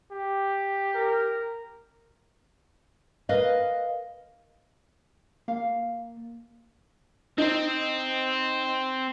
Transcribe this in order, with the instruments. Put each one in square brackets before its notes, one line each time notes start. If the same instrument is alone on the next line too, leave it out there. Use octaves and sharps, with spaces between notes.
[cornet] G4
[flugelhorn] A#4
[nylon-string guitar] A#4 B4 D#5 F5
[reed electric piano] A#3 [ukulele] F5
[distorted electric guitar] C4 C5 [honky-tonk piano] D#4